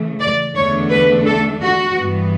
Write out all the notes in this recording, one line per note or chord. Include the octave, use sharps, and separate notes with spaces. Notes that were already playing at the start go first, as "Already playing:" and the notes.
Already playing: C#3 E3 A3
D5
E2 D3 A3 D4 C#5
B4
A4
F#4
G2 E3 B3